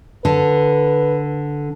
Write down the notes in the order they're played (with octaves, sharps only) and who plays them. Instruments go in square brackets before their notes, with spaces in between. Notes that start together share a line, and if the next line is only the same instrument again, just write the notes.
[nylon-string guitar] D3 [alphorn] B4